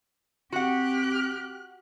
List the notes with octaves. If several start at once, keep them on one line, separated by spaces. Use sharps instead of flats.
C4 F#4 G4 F#5 F#6